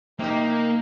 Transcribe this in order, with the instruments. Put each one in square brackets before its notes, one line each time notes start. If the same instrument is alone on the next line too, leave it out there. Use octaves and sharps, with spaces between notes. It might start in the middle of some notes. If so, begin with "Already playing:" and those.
[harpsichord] C3 G4 [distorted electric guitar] A#3 [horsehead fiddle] D#4